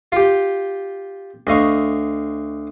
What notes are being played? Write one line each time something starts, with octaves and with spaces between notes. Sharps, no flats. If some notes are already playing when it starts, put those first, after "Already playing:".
F4 G4
D2 D#5 F5 C#6